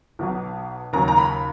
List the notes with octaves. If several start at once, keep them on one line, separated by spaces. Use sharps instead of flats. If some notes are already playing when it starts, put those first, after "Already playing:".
B1 B2 F#3
D#2 C#3 F#3 A#5
A#5
B5